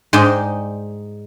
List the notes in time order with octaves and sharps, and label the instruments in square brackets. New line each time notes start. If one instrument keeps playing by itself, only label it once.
[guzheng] G#2 G#3 D#4 D5 G5